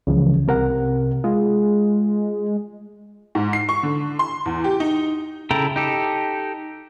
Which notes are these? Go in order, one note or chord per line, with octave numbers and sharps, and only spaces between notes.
C#2 C#3 E3 F3
C2 C3 A#4 F#5
G#3 F4
G#2
C7
C#6
D3
C6
E2
G4
D#4
C#3 E4 A4 G5 A#5
D#4 G4 A4